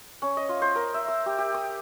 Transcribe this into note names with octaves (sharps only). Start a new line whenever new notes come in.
C#4
D#5
F4
C5
A#4
E5
E6
G4
G4
D#6